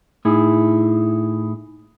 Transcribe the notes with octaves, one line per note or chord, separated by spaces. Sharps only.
A2 D#4 E4 G#4